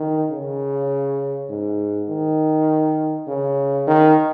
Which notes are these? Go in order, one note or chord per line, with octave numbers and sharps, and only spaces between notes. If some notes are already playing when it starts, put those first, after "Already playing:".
Already playing: D#3
C#3
G#2
D#3
C#3
D#3